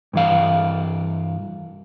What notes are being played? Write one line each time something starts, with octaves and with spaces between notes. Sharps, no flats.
G2 E3 F5